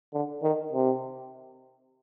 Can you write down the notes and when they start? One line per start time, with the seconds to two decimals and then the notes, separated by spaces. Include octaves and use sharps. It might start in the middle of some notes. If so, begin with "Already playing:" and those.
0.13 D3
0.43 D#3
0.73 C3